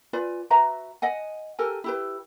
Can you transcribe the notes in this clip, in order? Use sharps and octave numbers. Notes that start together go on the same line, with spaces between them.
F4 B4 D5 G#5
F#4 B4 E5 A#5
D#5 F#5 G#5
G4 A4 A#4 G#5
E4 G4 B4